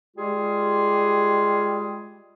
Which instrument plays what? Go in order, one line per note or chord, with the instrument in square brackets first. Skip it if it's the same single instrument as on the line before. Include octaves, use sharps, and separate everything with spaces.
[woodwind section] G3 G#3 F4 G4 G#4